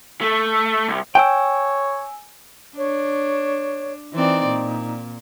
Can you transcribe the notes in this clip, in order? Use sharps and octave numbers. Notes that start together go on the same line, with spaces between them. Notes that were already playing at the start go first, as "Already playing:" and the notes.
A3
C2
C#5 G5 G#5 E6
D4 C#5
E3 C4 D#4 D5
A#2